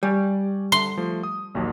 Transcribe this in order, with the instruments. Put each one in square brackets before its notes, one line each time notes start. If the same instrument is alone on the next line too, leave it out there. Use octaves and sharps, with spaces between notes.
[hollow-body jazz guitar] G3 [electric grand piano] D5 G#5 C#6
[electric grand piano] D3 [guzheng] C6
[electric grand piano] F3 A3
D#6
A#1 D#2 F#3